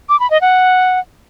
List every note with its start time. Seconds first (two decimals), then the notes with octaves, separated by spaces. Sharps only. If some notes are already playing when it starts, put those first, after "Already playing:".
0.09 D6
0.20 B5
0.30 D#5
0.41 F#5